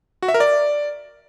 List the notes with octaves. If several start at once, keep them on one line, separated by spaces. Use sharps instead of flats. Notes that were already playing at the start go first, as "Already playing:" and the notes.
F#4
E5
A#4
D5